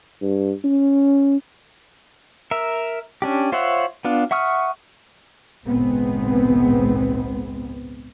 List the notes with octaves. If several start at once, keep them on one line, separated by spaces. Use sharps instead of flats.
G2
C#4
A#4 E5
C#4 D4 G4
F4 C5 C#5 E5 F#5
B3 D4 F4
E5 F#5 C#6 D#6 F6
G#1 C#2 A#2 G#3 B3 C4